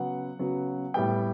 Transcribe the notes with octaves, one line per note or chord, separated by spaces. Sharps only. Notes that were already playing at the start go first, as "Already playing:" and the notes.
Already playing: C#3 F#3 B3 F#5
C#3 F#3 B3
A2 G3 B3 G5